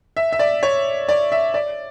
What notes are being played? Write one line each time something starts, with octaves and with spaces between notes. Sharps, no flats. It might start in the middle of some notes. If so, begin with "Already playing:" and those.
E5
E5
D5
C#5
D5
E5
D5